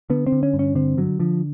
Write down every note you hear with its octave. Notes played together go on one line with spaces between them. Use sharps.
D3 B3
C4
D3
C#4
G2
C#4
D3 C4
D3 F#3
D3 F3